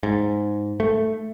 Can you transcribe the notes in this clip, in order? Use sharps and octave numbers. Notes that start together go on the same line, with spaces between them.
G#2
A3